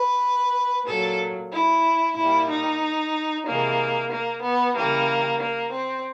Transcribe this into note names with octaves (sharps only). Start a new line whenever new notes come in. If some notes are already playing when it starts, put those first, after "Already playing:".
Already playing: B4
A#2 F#3 A4
E4
A#2 G3 E4
D#4
C3 E3 G#3 A#3
A#3
B3
C#3 E3 G3 A#3
A#3
C4